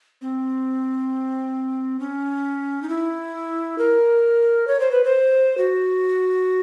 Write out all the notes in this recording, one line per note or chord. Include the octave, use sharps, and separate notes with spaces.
C4
C#4
D#4
E4
A#4
C#5
C5
B4
C5
F#4